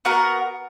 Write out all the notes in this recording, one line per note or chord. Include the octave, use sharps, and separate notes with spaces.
B3 F#4 A#4